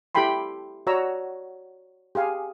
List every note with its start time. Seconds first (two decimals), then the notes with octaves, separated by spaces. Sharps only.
0.15 E4 G4 A4 G5 B5 C6
0.87 F#4 C#5 D5 F#5 A#5 E6
2.15 G4 G#4 F5 G#5